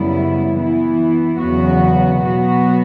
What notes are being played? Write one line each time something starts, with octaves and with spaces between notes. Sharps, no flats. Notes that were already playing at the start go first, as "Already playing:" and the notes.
Already playing: F#2 C#3 G3 B3 E4
E3 B3 E4
E2 C#3 F#3 B3 F#4
B2 F#3 B3 F#4